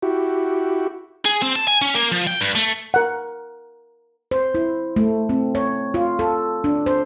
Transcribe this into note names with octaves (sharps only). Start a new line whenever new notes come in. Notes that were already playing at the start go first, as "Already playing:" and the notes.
E4 F#4 G4
G#4
C4
A5
G#5
C#4
A#3
F3
G5
G2
A3
A#4 F#5
C5
E4
A3
C4
C#5
F4
A4
D4
C5